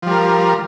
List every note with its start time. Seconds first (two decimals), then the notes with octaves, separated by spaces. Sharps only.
0.02 F3
0.07 G3
0.11 A#4